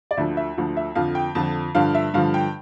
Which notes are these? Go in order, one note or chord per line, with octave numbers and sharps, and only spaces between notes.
D5
D2 D3 F3 E5
E5
D2 D3 F3
E5
F2 D3 F3 F5
G5
F2 D3 F3 A5
G2 D3 F3 F5
E5
G2 D3 F3 F5
G5